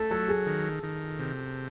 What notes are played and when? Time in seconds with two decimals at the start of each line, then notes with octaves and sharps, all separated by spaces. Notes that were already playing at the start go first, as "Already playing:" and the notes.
Already playing: A3 A4
0.11 F#3 A4
0.28 G#4
0.47 D#3
0.83 D#3
1.19 C3